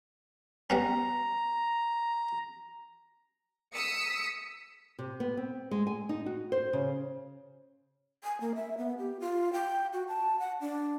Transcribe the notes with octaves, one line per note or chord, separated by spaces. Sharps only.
G3 B3 C#4 A#5
D#6 E6 B6 C#7
C3
B3
C4
G#3
G#5
D#4
F#4
C5
C#3
G#5
A#3
E5
B3
G4
F4
G5
F#4
A5
F#5
D4